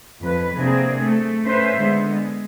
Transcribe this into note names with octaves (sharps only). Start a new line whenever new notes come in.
F2 B4
C3 A#3 C4 D4 G#4
A3
C#4 B4 C5 E5
D3 G#3 B3
G#3